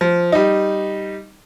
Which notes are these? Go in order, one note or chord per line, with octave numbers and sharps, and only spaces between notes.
F3
G3 D#4